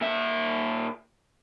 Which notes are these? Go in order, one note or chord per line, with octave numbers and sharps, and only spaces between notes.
A#2 E5